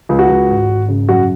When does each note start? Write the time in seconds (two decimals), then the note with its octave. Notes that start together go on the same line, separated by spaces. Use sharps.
0.09 C#2
0.19 F#4
0.29 C#2
0.49 G#1
0.69 G#1
0.88 C#3
1.09 F#2 F#4